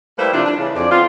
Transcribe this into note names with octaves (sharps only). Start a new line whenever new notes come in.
G3 A3 A#3 E4 B4 C5
C3 F3 A3 D4 E4 F4
D4
C#3 E3
F2 D5
B3 C4 D#4 F4